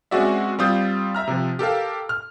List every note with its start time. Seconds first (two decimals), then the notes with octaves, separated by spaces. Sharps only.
0.11 G#3 C4 C#4 F#4 D5 E5
0.59 G3 C4 F4 D#6 G6
1.15 E5 A#5 F6
1.28 C3 F3
1.59 G4 A4 A#4 F5
2.09 F6